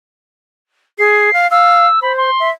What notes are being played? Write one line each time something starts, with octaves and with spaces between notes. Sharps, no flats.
G#4 C7
F5
F5 E6
C5 B5
C6
E5